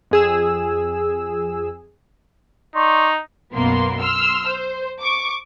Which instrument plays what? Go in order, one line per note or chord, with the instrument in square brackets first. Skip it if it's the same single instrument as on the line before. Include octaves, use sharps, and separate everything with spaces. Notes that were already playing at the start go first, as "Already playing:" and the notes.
[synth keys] F2 G#4 E6
[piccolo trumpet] D#4 [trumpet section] D5 C6 C#6
[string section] B1 F#2 B2 A#3 B3 C6
C6 E6 F6
C5
C#6 D6